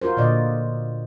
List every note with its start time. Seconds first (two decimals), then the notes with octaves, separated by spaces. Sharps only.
0.02 F4 F#4 A#4 C5
0.17 A#2 D3 D5 D#5